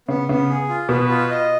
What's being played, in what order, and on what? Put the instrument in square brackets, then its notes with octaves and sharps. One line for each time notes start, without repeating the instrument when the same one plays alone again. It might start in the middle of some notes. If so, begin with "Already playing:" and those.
[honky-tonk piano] C#3 [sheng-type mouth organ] B3
[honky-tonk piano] C#3 [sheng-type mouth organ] B3
[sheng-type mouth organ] G#4
F4
[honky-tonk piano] B2 [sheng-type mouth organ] B4
[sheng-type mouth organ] F4
D#5